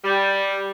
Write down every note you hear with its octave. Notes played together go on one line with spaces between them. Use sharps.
G3